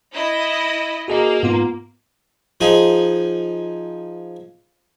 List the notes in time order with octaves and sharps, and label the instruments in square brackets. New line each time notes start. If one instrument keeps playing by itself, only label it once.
[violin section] E4 D#5
[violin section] A#3 [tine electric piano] F#4 G#4 D#5
[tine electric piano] G#2 B3 F4
[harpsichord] F3 D#4 G#4